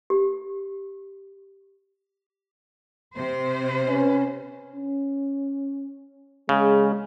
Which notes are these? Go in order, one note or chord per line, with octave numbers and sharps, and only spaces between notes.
G4
C3 C5
C#4 B4
C#4
C#3 G#3